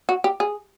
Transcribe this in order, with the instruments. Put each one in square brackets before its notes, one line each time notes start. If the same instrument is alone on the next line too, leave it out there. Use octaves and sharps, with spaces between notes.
[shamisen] F#4
G4
G#4